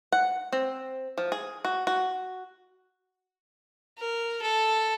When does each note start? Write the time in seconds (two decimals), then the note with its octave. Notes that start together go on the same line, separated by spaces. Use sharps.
0.12 F#5
0.52 C4
1.18 F3
1.32 G#4
1.65 F#4
1.87 F#4
3.98 A#4
4.42 A4